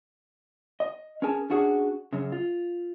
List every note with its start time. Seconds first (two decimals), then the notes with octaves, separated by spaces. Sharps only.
0.80 D#5
1.22 C#4 G#4 A#4 G#5 A5
1.50 C#4 D4 F#4 G#4
2.13 F#2 C#3
2.32 F4